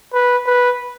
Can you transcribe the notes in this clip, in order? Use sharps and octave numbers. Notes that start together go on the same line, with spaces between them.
B4
B4